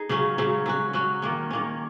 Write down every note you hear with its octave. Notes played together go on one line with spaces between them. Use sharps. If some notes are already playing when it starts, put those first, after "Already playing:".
Already playing: D#4 G#4
C#3 F#3 C#4
C#3 F#3 C#4
F#3 C#4 F#4
F#3 C#4 F#4
D#3 A#3 C#4
D#3 A#3 C#4